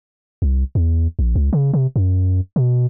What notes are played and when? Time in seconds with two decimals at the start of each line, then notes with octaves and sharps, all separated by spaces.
0.42 C2
0.75 E2
1.19 A#1
1.35 C#2
1.53 C#3
1.73 C3
1.96 F#2
2.56 B2